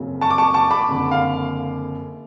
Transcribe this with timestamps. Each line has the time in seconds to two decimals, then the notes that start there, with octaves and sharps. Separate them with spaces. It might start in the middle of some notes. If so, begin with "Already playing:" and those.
Already playing: F#1 F2 C#3 F#3
0.21 A5 C#6
0.30 D6
0.38 A5 C#6
0.54 A5 C#6
0.71 B5 D6
0.88 F#1 F2 D3
1.11 F5